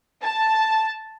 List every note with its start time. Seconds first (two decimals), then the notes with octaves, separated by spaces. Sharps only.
0.22 A5